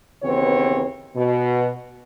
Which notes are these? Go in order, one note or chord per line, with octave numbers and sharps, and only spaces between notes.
D#2 C#3 E3 B3 C4 C#5
B2